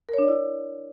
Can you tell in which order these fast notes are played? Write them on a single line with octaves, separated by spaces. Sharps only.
A#4 C#5 D4 D5 E4